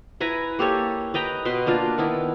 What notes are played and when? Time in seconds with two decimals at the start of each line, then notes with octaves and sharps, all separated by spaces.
0.20 E4 B4 G#5 A#5
0.59 A#3 G4 A4 C#5
1.14 B4 D#5 G5 A#5
1.45 B2 B4 C6
1.66 A#3 D4 F4 A#4
1.98 D#3 B3 E4